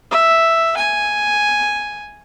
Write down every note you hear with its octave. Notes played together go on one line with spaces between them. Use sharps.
E5
G#5